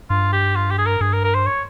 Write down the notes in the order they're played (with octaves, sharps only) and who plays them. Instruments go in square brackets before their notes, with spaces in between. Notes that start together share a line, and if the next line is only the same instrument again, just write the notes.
[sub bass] G2 [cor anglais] F4
[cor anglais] G4
F4
G4
G#4
A#4
[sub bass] G2 [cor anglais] G#4
[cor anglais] A#4
A#4
C5
C#5